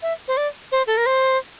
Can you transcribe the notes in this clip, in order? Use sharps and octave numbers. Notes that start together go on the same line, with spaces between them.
E5
C5
D5
C5
A4
A#4
C5